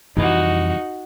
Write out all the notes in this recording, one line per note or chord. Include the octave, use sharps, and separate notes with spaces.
C2 F2 E3 D#4 F#4 D5